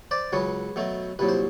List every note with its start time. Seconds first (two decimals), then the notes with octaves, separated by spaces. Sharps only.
0.11 C5 D5
0.33 C#2 C#3 F#3 B4 C#5
0.76 B2 F#3 A3
1.19 C2 A#2 F#3 B4
1.29 C5